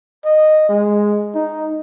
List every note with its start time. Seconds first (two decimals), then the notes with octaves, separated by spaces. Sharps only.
0.25 D#5
0.69 G#3
1.35 D#4